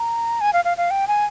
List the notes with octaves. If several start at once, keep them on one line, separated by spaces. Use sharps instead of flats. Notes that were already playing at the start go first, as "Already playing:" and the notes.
Already playing: A#5
G#5
F5
F5
F5
G5
G#5